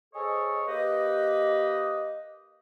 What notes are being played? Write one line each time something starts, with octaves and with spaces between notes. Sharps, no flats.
G#4 A4 C5 C#5 D#5
A#3 G4 B4 D#5